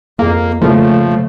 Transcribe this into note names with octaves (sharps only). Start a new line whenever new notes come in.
F2 A#3 G#4 F5
C#3 F3 A3 A#3 F4 G#4